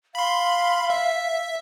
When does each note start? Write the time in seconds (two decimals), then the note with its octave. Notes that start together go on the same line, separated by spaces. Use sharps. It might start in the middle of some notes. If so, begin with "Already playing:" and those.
0.15 F5 B5 C6
0.90 E5